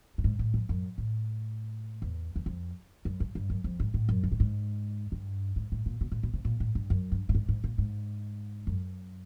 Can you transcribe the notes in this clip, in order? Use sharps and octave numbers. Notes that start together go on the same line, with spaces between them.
A2
G#2
A2
F2
F#2
A2
E2
E2
F2
F#2
G2
G2
F#2
F2
G#2
A2
F#2
G#2
A2
G#2
G2
G#2
A2
A#2
B2
A#2
B2
C3
A#2
A2
G2
F#2
G2
A2
G#2
G#2
A#2
G#2
F#2